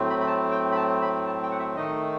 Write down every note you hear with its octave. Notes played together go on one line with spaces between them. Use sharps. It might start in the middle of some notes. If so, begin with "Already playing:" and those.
Already playing: A2 F#3 A3 C4
B5
B5
A5
G5
B5
A5
B5
A5
G5
F#5
E5
D#3 A3 D#4 D#5